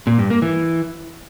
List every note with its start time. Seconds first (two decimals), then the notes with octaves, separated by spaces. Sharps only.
0.07 A#2
0.19 G2
0.30 A#3
0.42 E3